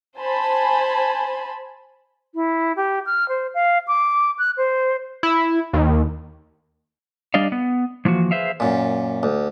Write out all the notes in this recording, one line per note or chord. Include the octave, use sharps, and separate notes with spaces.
C5 G#5 A5 B5
E4
G4
F6
C5
F5
D6
F#6
C5
E4
D#2
G3 D4 D5 D#5 F5
B3
E3 F3 A#3 F#4
G#4 B4 C5 E5 F5
F#2 A#2
D2